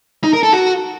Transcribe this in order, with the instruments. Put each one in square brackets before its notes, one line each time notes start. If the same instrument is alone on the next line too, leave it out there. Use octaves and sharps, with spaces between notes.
[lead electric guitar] D#4
A#4
A4
F#4